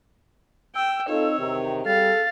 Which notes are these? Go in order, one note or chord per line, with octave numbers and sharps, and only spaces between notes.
G5 E6
C4 D#4 F4 A4 C#5
E2 C3 D#3
G3 G#4 A4 F5 A6